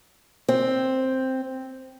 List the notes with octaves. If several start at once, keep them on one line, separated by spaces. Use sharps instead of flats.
C4